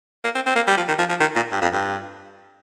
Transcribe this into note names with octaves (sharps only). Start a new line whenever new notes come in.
A#3
C4
C4
A#3
G3
F3
D#3
F3
F3
D#3
A#2
G2
F2
G2